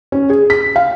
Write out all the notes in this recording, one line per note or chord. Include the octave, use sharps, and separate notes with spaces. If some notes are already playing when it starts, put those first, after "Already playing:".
C#4
G#4
B6
F5